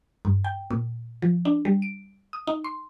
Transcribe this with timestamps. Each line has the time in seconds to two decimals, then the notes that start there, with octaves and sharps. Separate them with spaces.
0.25 G2
0.44 G5
0.71 A#2
1.22 F3
1.45 D4
1.65 G3
1.82 D7
2.33 D#6
2.47 D#4
2.64 C6